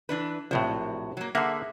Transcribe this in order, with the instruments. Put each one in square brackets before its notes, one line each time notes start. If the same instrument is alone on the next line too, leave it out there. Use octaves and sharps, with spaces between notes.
[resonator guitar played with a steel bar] E3 D4 B4
[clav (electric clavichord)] A#1 A2 [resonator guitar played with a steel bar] C3 F#3
[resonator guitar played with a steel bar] F#3 A#3
[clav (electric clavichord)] D3 A#3 [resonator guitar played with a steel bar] G#4 E5 F#5